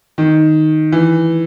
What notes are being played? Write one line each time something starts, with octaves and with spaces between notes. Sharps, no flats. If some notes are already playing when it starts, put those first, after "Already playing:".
D#3
E3